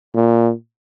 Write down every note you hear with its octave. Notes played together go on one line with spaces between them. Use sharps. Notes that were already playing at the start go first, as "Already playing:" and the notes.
A#2